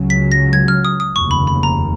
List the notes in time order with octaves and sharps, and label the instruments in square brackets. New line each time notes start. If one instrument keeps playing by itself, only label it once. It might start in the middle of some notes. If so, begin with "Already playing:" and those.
Already playing: [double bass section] C#2 C#3 F#3
[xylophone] B6
A#6
G#6
F6
D#6
D#6
[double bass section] F1 D#2 C#3 [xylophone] C#6
[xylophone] B5
B5
A#5